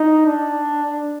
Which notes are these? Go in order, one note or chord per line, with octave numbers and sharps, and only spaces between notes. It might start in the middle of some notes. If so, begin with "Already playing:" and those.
Already playing: D#4
D4